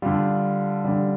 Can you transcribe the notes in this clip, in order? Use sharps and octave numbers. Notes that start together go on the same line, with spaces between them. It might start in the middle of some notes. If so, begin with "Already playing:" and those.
D3 G3 F4
D3 G3